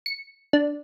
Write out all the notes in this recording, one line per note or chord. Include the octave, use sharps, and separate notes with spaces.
C#7
D4